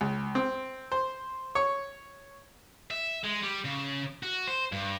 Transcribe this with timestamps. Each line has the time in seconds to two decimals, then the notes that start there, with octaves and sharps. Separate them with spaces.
0.01 C#2
0.35 C4
0.92 C5
1.55 C#5
2.91 E5
3.24 G#3
3.43 G3
3.65 C#3
4.23 F#4
4.47 C5
4.72 G2